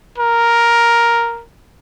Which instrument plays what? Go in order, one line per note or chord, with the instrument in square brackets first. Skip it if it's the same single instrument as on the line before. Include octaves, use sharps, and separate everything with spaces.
[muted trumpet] A#4